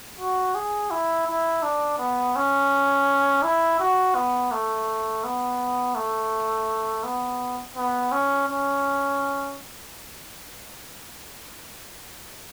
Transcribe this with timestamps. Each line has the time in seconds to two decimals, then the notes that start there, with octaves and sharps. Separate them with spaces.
0.19 F#4
0.55 G#4
0.91 E4
1.28 E4
1.63 D4
1.99 B3
2.36 C#4
3.43 E4
3.80 F#4
4.15 B3
4.52 A3
5.24 B3
5.95 A3
7.04 B3
7.76 B3
8.12 C#4
8.48 C#4